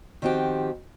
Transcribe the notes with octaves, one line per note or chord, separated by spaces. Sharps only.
D#3 F3 C4 F#4 G4